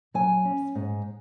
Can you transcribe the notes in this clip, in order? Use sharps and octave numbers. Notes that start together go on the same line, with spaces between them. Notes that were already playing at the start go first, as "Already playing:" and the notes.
F#3 G#5
C#4
G#2